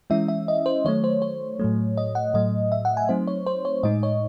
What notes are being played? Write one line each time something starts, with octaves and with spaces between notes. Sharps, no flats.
E3 G#3 C#4 E4 E5
E5
D#5
C5
D#3 F#3 A3 C#5
C5
C#5
A2 F#3 A3
D#5
F#5
A2 F#3 A3 D#5
E5
F#5
G#5
F#3 A3 C4 D#4 C5
C#5
C5
C#5
A2 G#3 D#4 D#5
C#5